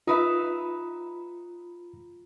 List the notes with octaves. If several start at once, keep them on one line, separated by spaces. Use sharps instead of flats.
D#4 F4 B4 E5